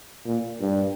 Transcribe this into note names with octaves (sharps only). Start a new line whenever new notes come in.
A#2
G2